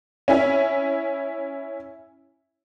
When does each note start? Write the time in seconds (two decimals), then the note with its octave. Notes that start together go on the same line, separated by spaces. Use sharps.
0.28 C#4 E4 G#5